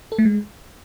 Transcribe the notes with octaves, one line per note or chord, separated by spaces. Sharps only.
A4
A3
G#3